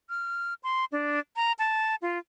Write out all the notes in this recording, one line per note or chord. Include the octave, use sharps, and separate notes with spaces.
F6
C6
D4
A#5
A5
F4